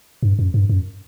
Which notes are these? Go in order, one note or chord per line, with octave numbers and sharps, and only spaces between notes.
G2
F#2
G2
F#2